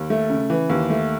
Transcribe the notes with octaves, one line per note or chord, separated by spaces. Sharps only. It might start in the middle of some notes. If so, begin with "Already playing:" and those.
Already playing: D#2
A3
C#3
E3
D#2
A3